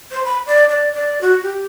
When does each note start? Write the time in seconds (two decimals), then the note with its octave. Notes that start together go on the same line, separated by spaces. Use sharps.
0.11 C5
0.25 B5
0.46 D5
0.69 D5
0.93 D5
1.21 F#4
1.43 G4